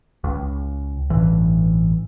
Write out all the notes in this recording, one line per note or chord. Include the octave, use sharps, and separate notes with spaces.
C#2
A1 G2 E3